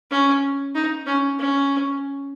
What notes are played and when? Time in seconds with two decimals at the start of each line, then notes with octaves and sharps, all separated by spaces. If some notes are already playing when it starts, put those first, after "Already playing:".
0.11 C#4
0.75 D#4
1.06 C#4
1.39 C#4